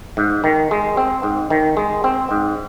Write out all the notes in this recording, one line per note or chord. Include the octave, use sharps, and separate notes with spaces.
G#2
D#3
G#3
C4
G#2
D#3
G#3
C4
G#2